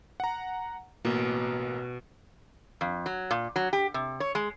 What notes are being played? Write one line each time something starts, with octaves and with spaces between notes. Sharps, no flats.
F#5 A#5
A1 B2 A#3
F2
F#3
A#2
F#3
G4
C3
C#5
G#3